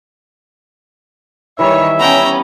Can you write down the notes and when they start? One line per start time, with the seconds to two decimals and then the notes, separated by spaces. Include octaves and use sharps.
1.59 D#3 E3 G3 C#5 E5
1.99 B3 C#4 G5 A#5